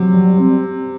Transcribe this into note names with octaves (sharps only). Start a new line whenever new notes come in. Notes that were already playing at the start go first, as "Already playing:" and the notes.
Already playing: C3 F#3
G3
C4